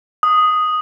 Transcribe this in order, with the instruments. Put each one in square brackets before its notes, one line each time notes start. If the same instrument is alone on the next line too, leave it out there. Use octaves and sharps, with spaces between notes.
[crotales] D#6